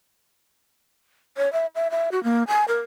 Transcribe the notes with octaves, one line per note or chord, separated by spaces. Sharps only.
C#5
E5
E5
E5
F#4
A#3
G#5
A#4